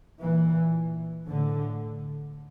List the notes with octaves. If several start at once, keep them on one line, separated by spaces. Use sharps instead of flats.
A#2 E3
A2 D3